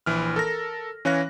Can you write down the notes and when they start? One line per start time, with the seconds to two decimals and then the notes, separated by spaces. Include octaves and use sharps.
0.06 A#1 E3 F6
0.36 A4 A#4 A#6
1.05 E3 C#4 C#5 F5 F#6 A#6